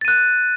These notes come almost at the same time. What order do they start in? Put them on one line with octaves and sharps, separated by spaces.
A6 D#7 F#6